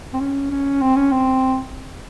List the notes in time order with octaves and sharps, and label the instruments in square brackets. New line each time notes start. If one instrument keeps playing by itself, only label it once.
[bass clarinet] C4
C#4
C#4
C4
C#4
C4